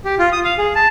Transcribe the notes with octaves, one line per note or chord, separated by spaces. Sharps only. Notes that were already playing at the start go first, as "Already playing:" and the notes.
G4
F4
D#6
F5
G#4
A5